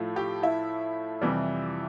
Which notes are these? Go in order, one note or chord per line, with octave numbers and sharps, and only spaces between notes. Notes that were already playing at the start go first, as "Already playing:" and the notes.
Already playing: A2 F3 A3
G4 G5
E4 E5
F2 C3 E3 G3